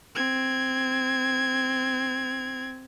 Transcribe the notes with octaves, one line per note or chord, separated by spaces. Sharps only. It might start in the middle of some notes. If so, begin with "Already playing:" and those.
C4 G#6